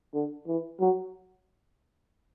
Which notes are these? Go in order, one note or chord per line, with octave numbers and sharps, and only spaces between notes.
D3
E3
F#3